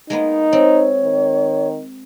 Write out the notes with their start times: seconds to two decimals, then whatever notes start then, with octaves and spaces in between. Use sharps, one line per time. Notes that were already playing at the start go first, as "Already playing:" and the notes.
0.10 G#3 A#3 B3 D#4
0.53 C4 C#5
1.04 D#3